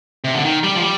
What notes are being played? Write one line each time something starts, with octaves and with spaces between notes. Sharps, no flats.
C3
D3
D#3
G3
F3
G3